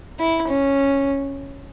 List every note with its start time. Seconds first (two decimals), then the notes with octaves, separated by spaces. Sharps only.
0.20 E4
0.48 C#4